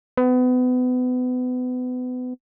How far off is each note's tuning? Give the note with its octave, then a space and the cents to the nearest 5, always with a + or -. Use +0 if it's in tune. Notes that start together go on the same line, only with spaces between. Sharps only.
B3 +30